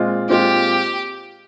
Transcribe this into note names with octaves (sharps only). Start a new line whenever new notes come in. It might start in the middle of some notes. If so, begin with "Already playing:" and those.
Already playing: A#2 G#3 C4 F4
A#2 G#3 C4 F4 G4